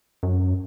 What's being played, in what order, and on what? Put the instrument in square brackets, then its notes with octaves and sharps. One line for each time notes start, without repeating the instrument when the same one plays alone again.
[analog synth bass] F#2